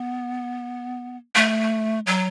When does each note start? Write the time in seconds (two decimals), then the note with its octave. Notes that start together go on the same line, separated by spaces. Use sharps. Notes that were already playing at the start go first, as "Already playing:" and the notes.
Already playing: B3
1.35 A3
2.07 F#3